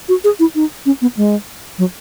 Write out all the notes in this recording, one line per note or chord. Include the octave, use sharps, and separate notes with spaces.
F#4
G#4
E4
D#4
C#4
B3
G#3
F#3